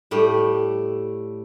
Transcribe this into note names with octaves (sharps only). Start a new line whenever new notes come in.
A2 G3 A3